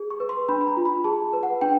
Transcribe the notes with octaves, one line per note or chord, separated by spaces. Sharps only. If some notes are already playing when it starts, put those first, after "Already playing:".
Already playing: G#4
C#6
B4
C6
D4 B5
B5
A#5
F4
B5
G#4 A5
B4
F#5
D4 G5